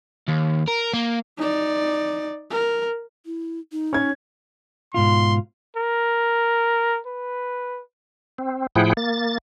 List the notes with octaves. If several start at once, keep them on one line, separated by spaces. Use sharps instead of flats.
D#2
A#4
A#3
D#4 D5
A#4
E4
D#4
C#4 G#6
G#2 B2 F4 C6
A#4
B4
C4
A2 F3 E4 G#4 F#5 G5
A#3 A6